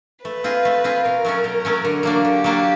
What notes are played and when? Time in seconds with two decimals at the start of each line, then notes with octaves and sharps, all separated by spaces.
0.24 A3 B4
0.44 C4 F4 G#4
0.65 A3
0.84 C4 F4 G#4
1.05 B2 A#4
1.25 F#3 A3 C#4
1.44 B2
1.65 F#3 A3 C#4
1.85 D3
2.03 F#3 A#3 D4
2.24 D3 G4
2.44 F#3 A#3 D4